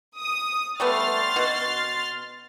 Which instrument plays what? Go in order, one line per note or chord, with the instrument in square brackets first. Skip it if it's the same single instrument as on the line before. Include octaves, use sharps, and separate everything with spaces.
[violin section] D#6
[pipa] G3 A3 B3 [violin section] C6 F6 A6
[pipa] B2 F#4